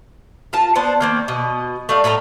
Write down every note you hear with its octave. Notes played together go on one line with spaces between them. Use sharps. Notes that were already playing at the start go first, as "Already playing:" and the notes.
F4 A#4 A5
B3 D4 C5 A5
D#3 A#3 C4
B2 D#5
A3 D#4 D5 F5
A2 A3 A4 A#5